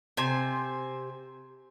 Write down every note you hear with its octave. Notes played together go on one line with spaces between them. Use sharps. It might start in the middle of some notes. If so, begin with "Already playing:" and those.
C3 C5 G#5